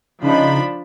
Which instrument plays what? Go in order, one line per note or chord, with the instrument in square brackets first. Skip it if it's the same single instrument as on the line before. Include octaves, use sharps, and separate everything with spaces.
[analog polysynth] C#3 D#4 [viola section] F3 D4 B5